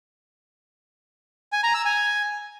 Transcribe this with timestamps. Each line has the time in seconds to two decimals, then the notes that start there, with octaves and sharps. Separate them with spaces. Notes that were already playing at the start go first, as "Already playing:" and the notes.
1.53 G#5
1.63 A#5
1.74 E6
1.85 G#5